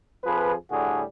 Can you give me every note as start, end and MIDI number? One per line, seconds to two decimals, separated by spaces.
0.24 0.54 41
0.24 0.54 53
0.24 0.54 68
0.24 0.54 71
0.71 1.02 45
0.71 1.02 50
0.71 1.02 55
0.71 1.02 66
0.71 1.02 68